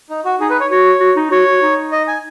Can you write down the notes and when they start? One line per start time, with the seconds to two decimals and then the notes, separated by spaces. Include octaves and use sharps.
0.10 D#4
0.25 F#4
0.39 D#4 G#4
0.50 B4
0.60 C#5
0.70 F#4 C#5
1.00 F#4
1.16 D#4
1.31 F#4 C#5
1.47 F#4
1.62 D#4
1.92 D#5
2.07 G#5